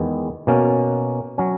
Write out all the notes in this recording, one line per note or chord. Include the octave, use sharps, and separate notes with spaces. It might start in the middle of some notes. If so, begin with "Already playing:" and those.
Already playing: E2 D#3 G#3 B3
B2 A#3 C#4
F#3 C#4